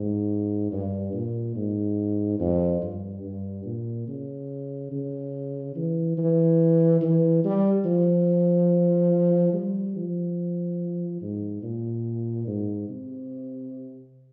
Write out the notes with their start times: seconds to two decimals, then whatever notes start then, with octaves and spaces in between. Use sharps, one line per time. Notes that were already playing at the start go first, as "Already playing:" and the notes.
Already playing: G#2
0.72 G2
1.14 A#2
1.56 G#2
2.40 F2
2.82 G2
3.23 G2
3.65 A#2
4.08 C#3
4.91 C#3
5.76 E3
6.18 E3
7.01 E3
7.44 G3
7.85 F3
9.53 G3
9.96 F3
11.22 G#2
11.63 A#2
12.47 G#2
12.89 C3